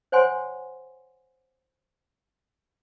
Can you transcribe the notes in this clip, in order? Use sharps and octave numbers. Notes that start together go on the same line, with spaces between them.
C5 C#5 F#5 G#5 C6